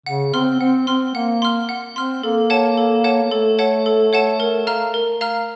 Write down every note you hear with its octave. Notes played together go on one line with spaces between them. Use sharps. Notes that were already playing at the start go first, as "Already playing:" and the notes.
C#3 F#5
C4 C6 F6
C4 F#5
C4 C6 F6
A#3 F#5
C6 F6
F#5
C4 C6 F6
A#3 A4
C#5 F#5 A5
A4
C#5 F#5 A5
A#3
A3 A4
C#5 F#5 A5
A4
C#5 F#5 A5
A#4
F5 A#5 F6
A#4
F5 A#5 F6